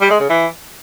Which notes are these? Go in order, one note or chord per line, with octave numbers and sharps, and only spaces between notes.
G3
G#3
C#3
E3